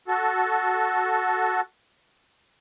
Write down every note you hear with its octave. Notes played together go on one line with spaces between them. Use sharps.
F#4 A4